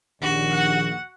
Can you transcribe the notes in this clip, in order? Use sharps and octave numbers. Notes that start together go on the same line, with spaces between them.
A#1 D#2 F#4
F#5